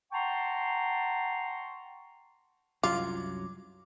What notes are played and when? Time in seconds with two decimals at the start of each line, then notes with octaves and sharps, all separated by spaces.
0.12 F#5 G5 A5 A#5 C6 C#6
2.83 C2 F#2 F#3 F4 D6